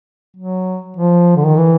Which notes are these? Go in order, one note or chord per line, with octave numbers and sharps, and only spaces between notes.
F#3
F3
D3
D#3
E3